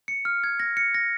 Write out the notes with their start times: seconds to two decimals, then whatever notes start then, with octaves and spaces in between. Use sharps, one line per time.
0.08 C#7
0.25 F6
0.44 G#6
0.60 A#6
0.77 C#7
0.94 A#6